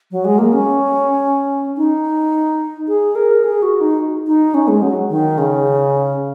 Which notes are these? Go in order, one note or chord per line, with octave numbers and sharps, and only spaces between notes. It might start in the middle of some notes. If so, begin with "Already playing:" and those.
F#3
G#3
A#3
C#4
D#4
G#4
A#4
G#4
F#4
D#4
D#4
C#4
G#3
F#3
D#3
C#3